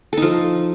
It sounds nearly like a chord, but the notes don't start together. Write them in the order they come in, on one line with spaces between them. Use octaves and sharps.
A4 D#4 F3